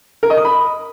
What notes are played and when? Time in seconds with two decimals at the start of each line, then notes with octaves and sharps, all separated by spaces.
0.23 A#4
0.30 D#5
0.37 D#6
0.45 B5